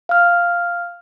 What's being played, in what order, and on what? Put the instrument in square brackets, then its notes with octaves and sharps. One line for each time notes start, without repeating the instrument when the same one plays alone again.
[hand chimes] F5 F6